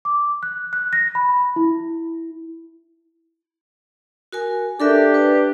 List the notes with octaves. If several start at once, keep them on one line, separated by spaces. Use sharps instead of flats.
D6
F#6
F#6
A#6
B5
E4
F#4 A#4 G#5
D4 G4 A4 A#4 E5
B4